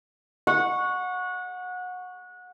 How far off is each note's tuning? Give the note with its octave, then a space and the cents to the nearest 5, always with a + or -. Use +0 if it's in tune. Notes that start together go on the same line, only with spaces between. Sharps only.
F#5 -25 C#6 +0